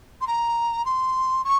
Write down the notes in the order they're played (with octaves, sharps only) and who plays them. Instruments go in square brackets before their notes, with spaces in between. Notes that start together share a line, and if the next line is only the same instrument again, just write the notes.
[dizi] C6
A#5
C6
C#6